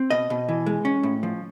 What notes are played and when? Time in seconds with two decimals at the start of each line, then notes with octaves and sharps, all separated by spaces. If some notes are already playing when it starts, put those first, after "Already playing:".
Already playing: C4
0.10 B2 D#5
0.30 B2
0.49 E3
0.66 G#3
0.85 C#4
1.03 A2
1.23 F3